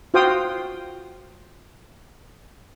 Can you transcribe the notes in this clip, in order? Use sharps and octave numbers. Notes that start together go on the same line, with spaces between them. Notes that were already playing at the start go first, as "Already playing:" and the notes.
F4 F#4 C5 F5 G5 D#6